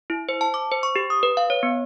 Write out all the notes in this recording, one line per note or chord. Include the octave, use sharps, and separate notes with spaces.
E4
C5
A5
D6
C5
C#6
G4
D#6
B4
F5
C#5
B3